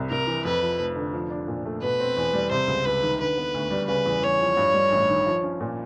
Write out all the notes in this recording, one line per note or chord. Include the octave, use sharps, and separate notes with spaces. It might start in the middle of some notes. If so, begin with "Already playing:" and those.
Already playing: C2 C3
C2 A#4
E3
F2 B4
F3
F1
D3
F3
D4
A#2
A3
B2 B4
C4
E2
G3
C3 C5
C#2
C#2 B4
D#3
D3 B4
B3
D2
G3
C#3 B4
E2
E2 C#5
F3
G2
G3
A1
D#3
F3
C#4
A#2